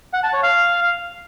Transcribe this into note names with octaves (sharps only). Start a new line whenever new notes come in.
F#5
A5
C#5
F5